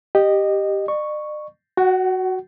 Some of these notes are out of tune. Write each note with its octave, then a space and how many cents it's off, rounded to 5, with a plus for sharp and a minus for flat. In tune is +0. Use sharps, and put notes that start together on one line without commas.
G4 +0 D#5 -15
D5 +45 C#6 +0
F#4 +0 F#5 +35